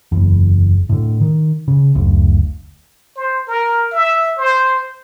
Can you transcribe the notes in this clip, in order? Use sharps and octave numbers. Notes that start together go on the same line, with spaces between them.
F#1 E2
A2 D3
D#3
C#3
F#1 D2
C5
A#4
E5
C5